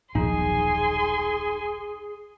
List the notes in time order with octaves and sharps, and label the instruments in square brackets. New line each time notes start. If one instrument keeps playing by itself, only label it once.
[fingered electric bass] D#1 B1 F3 [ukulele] D#4 [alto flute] G#4 [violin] G#5 C6